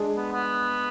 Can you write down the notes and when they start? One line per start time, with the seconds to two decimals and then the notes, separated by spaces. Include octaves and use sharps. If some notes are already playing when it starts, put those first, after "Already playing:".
Already playing: G#3 D4 G#4
0.17 B3
0.32 B3